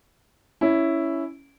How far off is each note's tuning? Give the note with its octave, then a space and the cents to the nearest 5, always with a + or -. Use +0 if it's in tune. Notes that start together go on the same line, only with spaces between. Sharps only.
C#4 +5 E4 +0